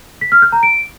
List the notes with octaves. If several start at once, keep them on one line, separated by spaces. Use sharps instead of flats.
B6
F6
G6
A#5
D7